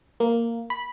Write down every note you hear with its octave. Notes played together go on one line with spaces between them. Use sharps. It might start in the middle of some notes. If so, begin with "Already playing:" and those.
A#3
B5